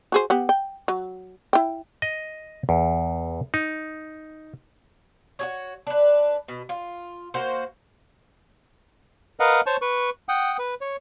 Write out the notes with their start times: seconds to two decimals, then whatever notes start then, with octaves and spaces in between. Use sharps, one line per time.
0.12 F#4 G#4 C5
0.30 B3 G4 F#5
0.49 G5
0.88 F#3
1.53 E4 G5
2.02 D#5
2.69 E2
3.54 D#4
5.39 F#4 G#4 C#5
5.87 D4 B4
6.48 B2
6.69 F4
7.34 A#3 F#4 C5
9.40 A#4 B4 D#5 F5 F#5
9.66 C5 C#5 A5 C#6
9.82 B4 C#6
10.29 F#5 G5 D#6
10.59 B4
10.81 C#5